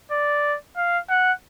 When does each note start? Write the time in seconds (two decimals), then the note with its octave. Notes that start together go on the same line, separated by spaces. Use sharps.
0.12 D5
0.77 F5
1.10 F#5